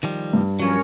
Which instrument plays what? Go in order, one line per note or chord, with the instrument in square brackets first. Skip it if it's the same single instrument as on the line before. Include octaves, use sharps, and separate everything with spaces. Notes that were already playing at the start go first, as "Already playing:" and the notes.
[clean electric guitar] D#3 F3 G3
[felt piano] G2
[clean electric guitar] F3 F#3 [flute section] C#4 A#4